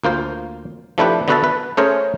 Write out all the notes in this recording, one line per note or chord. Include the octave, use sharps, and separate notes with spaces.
D2 A#3 F4 C5
F3 A3 D4 E4 G4 B4
D3 B3 F#4 B4 E5 A5
B4
A3 C#4 G#4 A#4 C5 C#5